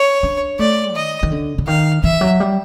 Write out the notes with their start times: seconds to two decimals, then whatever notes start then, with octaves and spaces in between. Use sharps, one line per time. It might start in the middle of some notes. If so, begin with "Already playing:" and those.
Already playing: C#5
0.23 D4
0.59 A3 D5
0.95 D#3 D#5
1.23 D#3
1.32 D3
1.58 D3
1.67 D#3 F5
2.03 E3 E5
2.21 F#3
2.40 G3